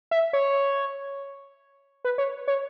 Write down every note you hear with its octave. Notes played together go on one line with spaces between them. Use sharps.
E5
C#5
B4
C#5
C#5